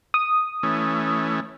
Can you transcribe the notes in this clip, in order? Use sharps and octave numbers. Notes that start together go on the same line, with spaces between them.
D#6
E3 A3 C#4